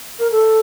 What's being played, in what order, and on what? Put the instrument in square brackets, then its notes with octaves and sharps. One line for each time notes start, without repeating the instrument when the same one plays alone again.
[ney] A#4
A4